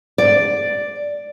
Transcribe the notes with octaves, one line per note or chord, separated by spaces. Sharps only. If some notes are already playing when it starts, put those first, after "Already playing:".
D5